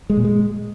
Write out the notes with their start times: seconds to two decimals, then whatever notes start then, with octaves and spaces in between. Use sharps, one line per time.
0.10 G#3
0.17 A#2
0.25 G#3